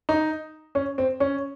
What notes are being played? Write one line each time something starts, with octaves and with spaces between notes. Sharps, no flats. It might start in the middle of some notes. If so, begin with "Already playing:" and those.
D#4
C#4
C4
C#4